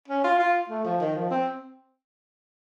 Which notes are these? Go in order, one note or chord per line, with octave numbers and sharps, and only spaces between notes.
C#4
F4
F4
A3
F3
D#3
F3
C4